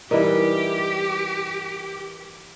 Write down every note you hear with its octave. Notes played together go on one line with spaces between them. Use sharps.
E3 G3 D#4 G4 A#4 B4 E5